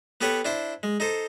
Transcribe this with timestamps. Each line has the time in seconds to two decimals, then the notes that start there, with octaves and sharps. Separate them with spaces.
0.21 B3 G4 A4 B4 C#5 F#5
0.45 D4 E4 C5
0.83 G#3
1.00 D#4 A4 C5